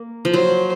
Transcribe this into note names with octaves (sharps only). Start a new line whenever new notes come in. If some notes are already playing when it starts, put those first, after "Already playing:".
Already playing: A#3
F3
F#3 C5